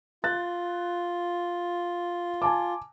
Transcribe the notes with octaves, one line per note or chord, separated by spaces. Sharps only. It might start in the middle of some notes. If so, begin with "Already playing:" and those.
F4 F#6 A6
G#5 A5 D6